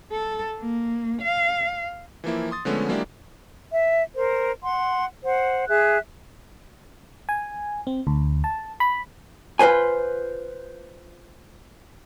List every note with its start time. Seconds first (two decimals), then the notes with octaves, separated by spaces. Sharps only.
0.12 A4
0.60 A#3
1.22 F5
2.24 E3 F3 A#3 E4
2.51 C6 D#6 A6
2.65 D3 F3 G#3 A3 B3 C#4
2.89 F#3 G#3 A#3 D4 E4 G4
3.73 E5
4.14 A#4 C5
4.62 F#5 C6
5.24 C5 F#5
5.67 G#4 E5 F#6
7.29 G#5
7.87 C4
8.07 D2
8.44 A5
8.80 B5
9.59 F4 B4 C5 G#5